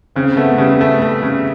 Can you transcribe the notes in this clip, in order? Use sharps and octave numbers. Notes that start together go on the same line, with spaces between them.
C#3 C4
A3 B3
C#3 G3
A3
A3
C#3